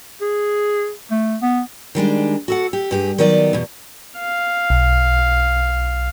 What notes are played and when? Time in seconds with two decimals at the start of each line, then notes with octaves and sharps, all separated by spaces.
0.22 G#4
1.11 A3
1.42 B3
1.95 D#3 G3 G#3 D4
2.48 F#4 A4 F#5
2.73 G4
2.91 G2 G4 G#4
3.18 D#3 F#3 B3 D#4 D5 D#5
3.53 E2 B2
4.19 F5
4.70 B1